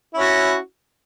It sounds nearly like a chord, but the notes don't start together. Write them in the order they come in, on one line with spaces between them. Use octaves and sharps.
E4 C#4 F#4